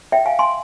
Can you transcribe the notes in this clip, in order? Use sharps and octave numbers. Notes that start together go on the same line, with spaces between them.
E5 G5
F5 G#5
G#5 C6